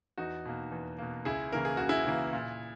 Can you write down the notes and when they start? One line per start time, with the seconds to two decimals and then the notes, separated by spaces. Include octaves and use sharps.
0.18 E2 D#4 F#4
0.45 B2 A#3
0.72 E2
0.98 B2 A#3
1.25 C#2 E4 G#4
1.52 C#3 E3 A#3 A#4
1.65 G#4
1.77 C#2 F#4
1.89 E4 G#4
2.07 C#3 E3 A#3
2.33 A#2